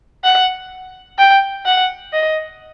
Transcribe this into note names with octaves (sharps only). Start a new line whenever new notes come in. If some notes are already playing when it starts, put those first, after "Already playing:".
F#5
G5
F#5
D#5